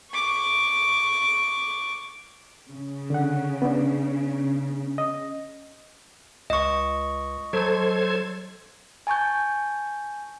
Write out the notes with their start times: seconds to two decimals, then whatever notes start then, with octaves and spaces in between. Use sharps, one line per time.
0.13 C#6 D6
2.70 C#3
3.10 D3 F#5
3.62 B3 D4
4.98 D#5
6.50 C#2 D#5 C#6
7.53 F#3 A4 C5 G#6
9.07 G#5 A5 C#6 G6